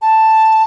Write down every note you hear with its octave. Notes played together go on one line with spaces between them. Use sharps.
A5